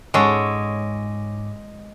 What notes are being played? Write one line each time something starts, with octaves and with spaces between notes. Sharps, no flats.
G#2 G#3 C#4 F#4 A4 C#5 D6